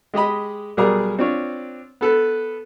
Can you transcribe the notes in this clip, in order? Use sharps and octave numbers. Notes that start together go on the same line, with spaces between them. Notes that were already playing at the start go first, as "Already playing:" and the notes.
G#3 G4 D#5 B5
B1 G3 G#4 A#4 D5 A#5
C4 D4 F4 C#5
B3 A4 B4